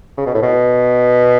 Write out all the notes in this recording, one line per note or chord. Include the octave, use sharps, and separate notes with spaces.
C#3
B2
A2
B2